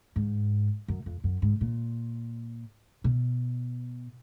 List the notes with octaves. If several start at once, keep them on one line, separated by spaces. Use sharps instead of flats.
G#2
F#2
F2
F#2
G#2
A#2
B2